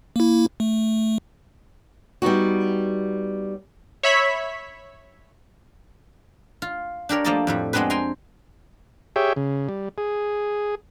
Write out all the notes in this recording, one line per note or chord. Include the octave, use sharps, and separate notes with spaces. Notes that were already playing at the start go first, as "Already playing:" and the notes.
A#3 E4
A3
G3 B3 D#4 F#4
C#5 E5 B5 B6
F4
D4 G4 A#4 C#5
F3 A3 A#3 D5 D#5 A5
F2 A2 G3
G#3 B3 C4 D4 B4
G5 G#5 A#5 C6
G4 G#4 C#5 E5 G5
C#3
G3
G#4